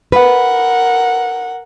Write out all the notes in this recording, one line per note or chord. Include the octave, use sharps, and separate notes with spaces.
A#4 B4 F#5